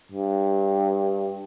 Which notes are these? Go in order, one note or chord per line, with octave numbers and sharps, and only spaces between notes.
G2